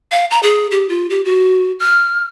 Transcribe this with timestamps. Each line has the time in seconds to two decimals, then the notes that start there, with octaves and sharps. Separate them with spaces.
0.12 F5
0.31 A#5
0.43 G#4
0.71 G4
0.89 F4
1.10 G4
1.25 F#4
1.80 F6